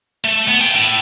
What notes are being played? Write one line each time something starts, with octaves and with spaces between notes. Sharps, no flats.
A3
B3
F5 G5
A2